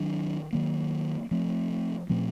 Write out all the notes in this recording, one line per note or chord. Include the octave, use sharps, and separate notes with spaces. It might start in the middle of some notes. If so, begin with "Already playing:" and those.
Already playing: D#3 F#3 D4
D#3 F#3 A#3
F3 A3 C4
A#2 F3 A3 C4